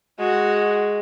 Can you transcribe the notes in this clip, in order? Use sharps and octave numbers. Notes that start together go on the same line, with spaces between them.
G#3 F#4